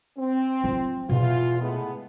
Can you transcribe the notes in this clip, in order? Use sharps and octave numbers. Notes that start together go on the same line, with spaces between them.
C4
F#3 F4
E2 B2 F4
A2 G#3 B3